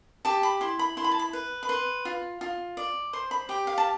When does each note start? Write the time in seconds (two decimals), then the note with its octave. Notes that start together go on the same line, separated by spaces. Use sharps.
0.25 G4 A5
0.43 B5
0.61 E4 C6
0.79 B5
0.97 E4 C6
1.04 B5
1.12 A5
1.19 B5
1.33 B4
1.63 B5
1.69 B4 C6
2.05 F4
2.41 F4
2.77 D5
3.13 C5 C6
3.31 B5
3.49 G4 G5
3.67 F5
3.78 A5